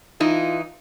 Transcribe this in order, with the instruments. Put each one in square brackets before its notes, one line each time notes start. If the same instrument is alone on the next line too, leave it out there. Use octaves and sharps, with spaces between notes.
[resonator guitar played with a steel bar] E3 D#4 [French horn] F4